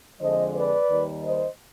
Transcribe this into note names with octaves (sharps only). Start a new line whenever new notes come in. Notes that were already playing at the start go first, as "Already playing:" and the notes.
F2 D3 F3 G#3 C5 D#5
B4 D5
D#2 D#3 G3
C5 D#5